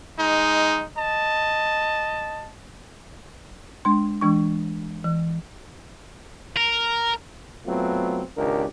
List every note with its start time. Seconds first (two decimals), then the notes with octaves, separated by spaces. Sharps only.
0.18 G#3 D#4
0.96 D#5 A5
3.85 G#3 D4 C6
4.21 E3 G#3 D4 C#6
5.05 E3
6.57 A#4
7.66 F#3 A3 B3 C4 F4
8.37 G#1 C#2 D4 G4 A#4